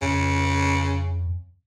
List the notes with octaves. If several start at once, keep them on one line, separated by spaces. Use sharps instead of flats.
F2 C#3